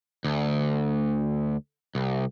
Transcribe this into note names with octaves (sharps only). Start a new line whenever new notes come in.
D2
C2